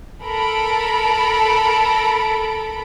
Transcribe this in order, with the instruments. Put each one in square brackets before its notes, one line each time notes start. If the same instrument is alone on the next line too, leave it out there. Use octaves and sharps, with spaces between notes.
[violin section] A4 A#4 B5 D7